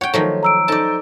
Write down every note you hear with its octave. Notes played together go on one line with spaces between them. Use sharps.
C#5 F#5 G5
D#3 F3 F#3 A3
A#5 E6 D7
D#4 A4 C5 D5 A5